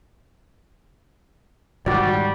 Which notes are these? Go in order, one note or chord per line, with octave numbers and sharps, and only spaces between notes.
G#2 D#3 G3 F#4 D5